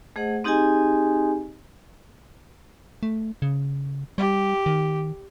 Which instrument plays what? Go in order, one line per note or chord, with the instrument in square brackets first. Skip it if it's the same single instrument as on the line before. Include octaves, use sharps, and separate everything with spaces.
[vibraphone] A3 G#4 C5 D#5 F#5
C4 D#4 G4 G#4 D#5 G#5
[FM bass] A3
C#3
[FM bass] G3 [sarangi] G4
[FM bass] D#3